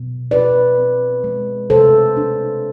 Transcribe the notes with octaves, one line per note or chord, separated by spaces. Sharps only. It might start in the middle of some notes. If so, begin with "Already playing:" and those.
Already playing: B2
F4 B4 D5
C4
G#3
C3 A4 C5
D4